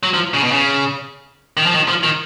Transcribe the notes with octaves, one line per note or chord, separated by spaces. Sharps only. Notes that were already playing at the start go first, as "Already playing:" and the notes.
F#3
F3
C#3
B2
C#3
D#3
F3
D#3
F3
D#3